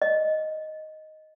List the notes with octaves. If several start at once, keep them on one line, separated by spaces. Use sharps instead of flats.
D#5